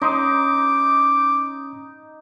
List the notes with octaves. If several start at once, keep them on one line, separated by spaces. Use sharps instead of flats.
C#4 D#4 C6 D6 D#6